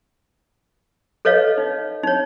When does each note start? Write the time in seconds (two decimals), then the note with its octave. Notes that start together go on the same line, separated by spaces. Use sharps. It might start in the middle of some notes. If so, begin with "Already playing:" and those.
1.25 A4 B4 C#5 D#5 F5
1.58 D#4
2.03 D#4 C#5